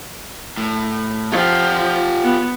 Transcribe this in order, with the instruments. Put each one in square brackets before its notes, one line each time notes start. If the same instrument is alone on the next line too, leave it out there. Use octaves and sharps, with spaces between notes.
[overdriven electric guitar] A2
[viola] F3 [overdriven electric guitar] F4 G4
[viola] B3